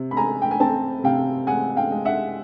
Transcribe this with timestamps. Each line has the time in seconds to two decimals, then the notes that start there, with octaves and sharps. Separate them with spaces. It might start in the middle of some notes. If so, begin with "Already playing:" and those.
Already playing: C3
0.11 B5
0.17 G#3 G#5 A#5
0.42 G5
0.51 G#5
0.60 C4 G5 A5
1.04 C3 F5 G5
1.47 G#3 F#5 G#5
1.76 F5 G5
1.91 G#3
2.05 E5 F#5